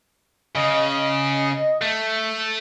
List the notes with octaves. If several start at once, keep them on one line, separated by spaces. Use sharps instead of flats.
C#3 D#5
A3